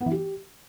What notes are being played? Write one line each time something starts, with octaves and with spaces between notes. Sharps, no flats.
B3
E3
G4